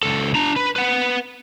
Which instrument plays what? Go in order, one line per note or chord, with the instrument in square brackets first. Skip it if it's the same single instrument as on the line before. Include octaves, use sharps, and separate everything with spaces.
[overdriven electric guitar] C#2 A4
D4 A#5
B4
B4 F#5